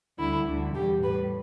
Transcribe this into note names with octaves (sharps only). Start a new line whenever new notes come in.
D2 D3 G3 E4
D2 D3 G3
E2 B2 G3 G4
A2 G3 B4